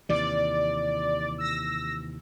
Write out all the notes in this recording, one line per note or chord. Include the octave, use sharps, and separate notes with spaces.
D#2 C3 E3 D5
E6 A#6